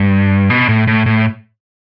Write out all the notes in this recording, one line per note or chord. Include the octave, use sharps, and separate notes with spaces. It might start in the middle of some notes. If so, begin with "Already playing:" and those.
Already playing: G2
B2
A2
A2
A2